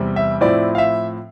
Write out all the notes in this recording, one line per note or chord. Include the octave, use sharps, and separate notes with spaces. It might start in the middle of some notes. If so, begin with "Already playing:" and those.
Already playing: E2 C3 G3 C4
E5
A2 F3 C4 E4 D5
F5
E5